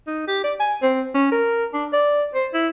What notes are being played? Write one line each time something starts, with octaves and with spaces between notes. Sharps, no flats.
D#4
G4
D5
G#5
C4
C#4
A#4
D4
D5
C5
E4